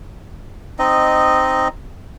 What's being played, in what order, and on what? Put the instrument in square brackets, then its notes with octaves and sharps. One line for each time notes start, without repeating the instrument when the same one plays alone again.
[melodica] C4 D#4 D#5